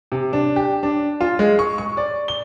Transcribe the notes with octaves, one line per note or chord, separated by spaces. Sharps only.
C3
D4
G4
D4
F4
G#3
C#6
C#6
D5
G7